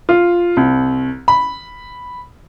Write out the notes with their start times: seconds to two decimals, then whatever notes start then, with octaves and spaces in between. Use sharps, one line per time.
0.09 F4
0.57 C2
1.28 B5